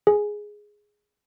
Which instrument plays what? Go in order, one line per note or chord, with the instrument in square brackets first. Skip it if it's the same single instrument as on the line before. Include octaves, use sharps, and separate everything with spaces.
[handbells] G#4